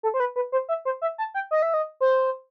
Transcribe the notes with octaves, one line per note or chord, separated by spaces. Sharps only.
A4
C5
B4
B4
C5
E5
C5
E5
A5
G5
D#5
E5
D#5
C5